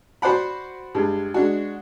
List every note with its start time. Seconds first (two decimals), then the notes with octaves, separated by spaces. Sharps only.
0.22 F#4 C5 D5 F#5 B5
0.95 G2 G#3
1.34 G#3 D4 F#4